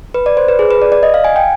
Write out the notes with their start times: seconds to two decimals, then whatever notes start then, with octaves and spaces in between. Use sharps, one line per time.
0.14 B4
0.26 D5
0.37 C5
0.48 B4
0.59 G#4
0.71 B4
0.82 D5
0.92 D5
1.03 D#5
1.14 F5
1.24 G#5
1.36 G5